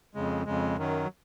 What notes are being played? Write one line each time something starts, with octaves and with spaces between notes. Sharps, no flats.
F2 C#3 G#3
F2 C#3 G#3
F#2 D#3 F#3